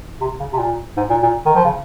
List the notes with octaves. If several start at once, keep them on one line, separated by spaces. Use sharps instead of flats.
C3
C#3
C3
A#2
G#2
A#2
A#2
D#3
F3
C#3